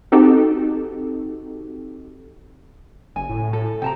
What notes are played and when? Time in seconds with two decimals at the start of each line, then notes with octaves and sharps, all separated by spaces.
0.12 C4 D#4 F#4 G4 A4
3.16 F#1 G#5
3.29 A2
3.53 A4
3.82 C3 G5 A5 A#5